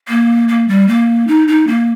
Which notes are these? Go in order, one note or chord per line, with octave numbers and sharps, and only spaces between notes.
A#3
A#3
G3
A#3
D#4
D#4
A#3